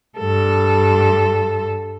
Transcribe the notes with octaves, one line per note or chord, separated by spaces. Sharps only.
G2 A4